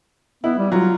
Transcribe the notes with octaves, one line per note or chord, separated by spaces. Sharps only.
B3 E4
G3
F#3 F4